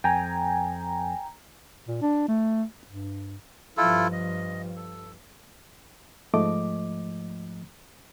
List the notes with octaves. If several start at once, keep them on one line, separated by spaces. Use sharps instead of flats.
F2 G5 G#5 A#5
A#2
D4
A3
G2
G2 F3 E4 F4 A4
D#5
A4
G#2 F3 A3 D#5 D6